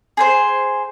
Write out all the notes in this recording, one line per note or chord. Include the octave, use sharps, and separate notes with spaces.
G#4 B4 C5